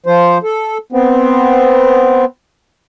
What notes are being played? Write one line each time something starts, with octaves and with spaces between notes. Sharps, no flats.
F3 C5
A4
B3 C4